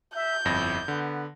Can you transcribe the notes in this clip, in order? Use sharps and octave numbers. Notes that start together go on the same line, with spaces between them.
E5 G6
G1 F2 E4 A#6
D3 B3